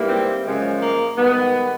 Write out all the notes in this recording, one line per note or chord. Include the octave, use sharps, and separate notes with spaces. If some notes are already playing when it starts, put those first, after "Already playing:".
Already playing: G#2 E3 G3 A#3
C4
F#2 C#3 F3 G#3
A#3
G#2 D#3 G3 B3